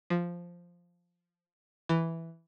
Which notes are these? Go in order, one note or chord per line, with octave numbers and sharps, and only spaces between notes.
F3
E3